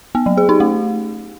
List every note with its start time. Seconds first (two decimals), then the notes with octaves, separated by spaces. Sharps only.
0.15 B3
0.26 F#3
0.37 G#4
0.49 D#4
0.60 A3